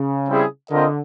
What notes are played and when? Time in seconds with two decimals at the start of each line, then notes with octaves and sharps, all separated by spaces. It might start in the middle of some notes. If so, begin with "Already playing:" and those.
Already playing: C#3
0.29 G3 C4 E4 G#4
0.70 D3 C4 F4 A#4 D#5